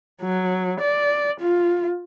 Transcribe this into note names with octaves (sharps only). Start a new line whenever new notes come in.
F#3
D5
F4